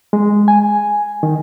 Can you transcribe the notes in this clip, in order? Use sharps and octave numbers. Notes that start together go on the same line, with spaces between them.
G#3
G#5
D#3